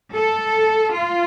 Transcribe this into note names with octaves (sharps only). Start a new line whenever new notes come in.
A4
F4